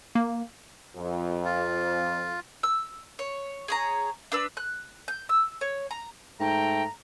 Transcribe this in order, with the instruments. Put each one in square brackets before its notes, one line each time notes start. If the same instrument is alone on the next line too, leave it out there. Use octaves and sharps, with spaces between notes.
[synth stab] A#3
[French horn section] F2
[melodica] F4
[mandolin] E6
C#5
G#4 C#5 A#5
D4 B4 E6
F#6
G6
E6
C#5
A#5
[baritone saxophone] G#2 [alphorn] A3 [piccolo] G5 [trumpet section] A#5